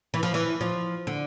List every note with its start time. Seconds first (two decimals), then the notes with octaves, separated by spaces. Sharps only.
0.14 E3
0.23 F3
0.34 E3
0.61 F3
1.07 D3